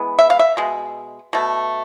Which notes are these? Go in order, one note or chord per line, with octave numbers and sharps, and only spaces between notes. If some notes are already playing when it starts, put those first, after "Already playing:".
Already playing: E3 G#3 B3
E5
F5
E5
B2 G#3
B2 A3